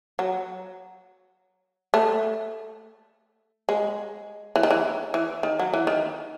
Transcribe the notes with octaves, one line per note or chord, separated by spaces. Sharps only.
F#3
A3
G#3
E3
D#3
E3
E3
D#3
F#3
E3
D#3